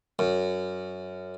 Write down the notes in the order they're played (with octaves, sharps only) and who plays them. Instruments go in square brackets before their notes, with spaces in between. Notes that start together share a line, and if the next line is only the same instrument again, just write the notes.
[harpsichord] F#2